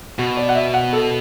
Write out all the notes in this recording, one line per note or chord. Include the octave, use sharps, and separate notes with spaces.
B2 F#4
D5
F#5
E5
F#5
A4